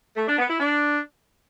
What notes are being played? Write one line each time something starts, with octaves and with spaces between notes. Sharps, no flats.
A3
D4
B3
E4
D4